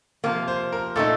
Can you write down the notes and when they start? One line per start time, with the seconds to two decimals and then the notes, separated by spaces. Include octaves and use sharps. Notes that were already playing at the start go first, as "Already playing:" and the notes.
0.24 C3 F3 A#3
0.48 C5
0.72 A#4
0.96 A#2 A3 D#4 A4